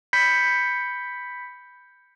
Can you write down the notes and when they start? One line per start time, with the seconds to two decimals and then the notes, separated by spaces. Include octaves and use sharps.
0.13 B5 G6 B6 C#7